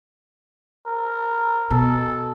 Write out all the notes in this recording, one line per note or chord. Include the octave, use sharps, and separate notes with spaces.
A#4
B2 A4